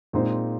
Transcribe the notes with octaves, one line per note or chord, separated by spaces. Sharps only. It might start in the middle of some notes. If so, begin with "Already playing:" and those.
A#2 G#3 C4 D#4 C5